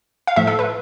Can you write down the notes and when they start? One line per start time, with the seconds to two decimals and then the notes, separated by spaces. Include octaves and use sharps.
0.27 F5
0.36 A2 F3 A3 E5
0.47 A4
0.59 B4